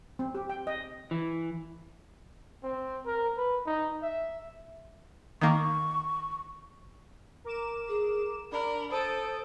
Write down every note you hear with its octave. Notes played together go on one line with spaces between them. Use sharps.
C4
G4
G5
D#5
E3
C4
A#4
B4
D#4
E5
D#3 A#3 C#6
A#4 D6 E7
G#4
D4 A#4 B5
A4 C5 A5 D#6 D7